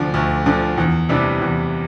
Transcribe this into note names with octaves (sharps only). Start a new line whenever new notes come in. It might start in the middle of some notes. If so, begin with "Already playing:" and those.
Already playing: D2 D3 F3
D2
D3 F3
E2
C3 E3 G3 D4
E2